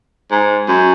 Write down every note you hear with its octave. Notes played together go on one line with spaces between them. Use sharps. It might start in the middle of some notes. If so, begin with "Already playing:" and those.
G#2
F#2